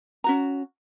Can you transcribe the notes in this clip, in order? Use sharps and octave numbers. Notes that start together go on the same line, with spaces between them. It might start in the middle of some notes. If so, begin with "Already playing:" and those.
C#4 F#4 A#5